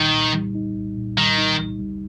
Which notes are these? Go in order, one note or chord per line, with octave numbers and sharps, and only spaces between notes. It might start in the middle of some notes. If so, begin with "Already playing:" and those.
Already playing: C2 A#2 D#3 G3 D#4
A#2
G3
D#4
C2
A#2
D#3 G3
D#4
C2
G3